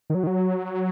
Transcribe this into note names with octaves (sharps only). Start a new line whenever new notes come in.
D#3
F#3
D#3
F#3